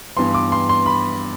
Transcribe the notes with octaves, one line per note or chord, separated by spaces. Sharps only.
G2 E3 B3 C6
D6
C6
C6
B5